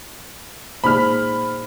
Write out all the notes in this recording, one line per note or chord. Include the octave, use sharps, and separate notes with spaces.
A#2 G#3 D#4 C5 B5 F6 B6